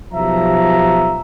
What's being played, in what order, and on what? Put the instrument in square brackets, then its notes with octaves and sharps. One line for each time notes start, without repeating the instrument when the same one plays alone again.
[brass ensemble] B1 F3 G4 E5 A#5